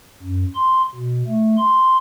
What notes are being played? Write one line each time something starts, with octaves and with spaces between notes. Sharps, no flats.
F#2
C6
B2
A3
C6